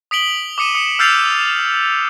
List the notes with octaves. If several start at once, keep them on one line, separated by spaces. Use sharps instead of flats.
D#6 B6 D7 F#7 G7
D6 D#6 C#7 D#7 E7
D#6 C#7
E6 F6 G6 A6 C7 F7